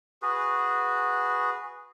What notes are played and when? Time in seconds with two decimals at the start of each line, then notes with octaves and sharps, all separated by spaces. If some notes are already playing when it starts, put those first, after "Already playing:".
0.22 F#4 G#4 B4